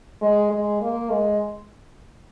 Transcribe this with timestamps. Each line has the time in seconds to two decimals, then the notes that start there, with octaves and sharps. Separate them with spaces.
0.22 G#3
0.51 G#3
0.81 A#3
1.10 G#3